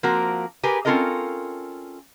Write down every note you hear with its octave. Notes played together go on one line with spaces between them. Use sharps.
F3 A#3 C4 F#4 A#4
G4 G#4 A#4 B4 G#5
C4 C#4 F4 A4 A#4 D#5